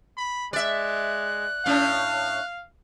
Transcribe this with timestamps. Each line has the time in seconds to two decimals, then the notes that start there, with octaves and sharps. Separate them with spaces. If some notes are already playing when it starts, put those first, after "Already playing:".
0.17 B5
0.53 G#3 D5 E5 F#6
1.66 A2 C#4 F5